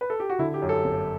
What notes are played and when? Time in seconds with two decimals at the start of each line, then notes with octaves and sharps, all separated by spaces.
0.01 B4
0.10 A4
0.20 G4
0.29 F#4
0.39 D3 E4
0.54 G4
0.62 F#2
0.69 A4
0.84 G1